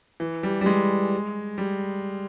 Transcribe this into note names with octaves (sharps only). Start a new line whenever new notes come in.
E3
G3
G3
G#3
G3